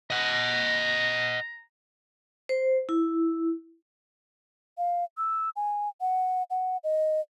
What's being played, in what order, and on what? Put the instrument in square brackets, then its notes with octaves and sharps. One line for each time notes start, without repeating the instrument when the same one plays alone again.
[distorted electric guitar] D#5 F#5 [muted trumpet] A#5
[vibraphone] C5
E4
[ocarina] F5
E6
G#5
F#5
F#5
D#5